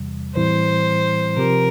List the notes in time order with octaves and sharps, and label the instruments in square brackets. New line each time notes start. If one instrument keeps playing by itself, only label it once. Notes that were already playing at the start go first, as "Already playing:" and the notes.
Already playing: [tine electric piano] E2 C3 E3 G3
[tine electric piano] A2 E3 G3 C4 E4 [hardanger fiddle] C5
[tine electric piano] C3 F3 C4 G4 [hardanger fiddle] A#4